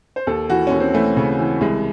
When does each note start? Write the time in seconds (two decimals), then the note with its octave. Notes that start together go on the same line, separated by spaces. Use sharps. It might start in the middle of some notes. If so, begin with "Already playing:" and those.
0.16 C5
0.27 D#2 A4
0.50 E3 F#4
0.67 D#2 C#4
0.80 C4
0.94 E3 A3
1.16 C#3
1.39 E3
1.61 C2 G#3